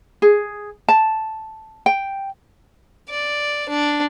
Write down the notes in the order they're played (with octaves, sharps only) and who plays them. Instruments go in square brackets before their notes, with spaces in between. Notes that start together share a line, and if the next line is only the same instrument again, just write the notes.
[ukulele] G#4
A5
G5
[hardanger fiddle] D5
D4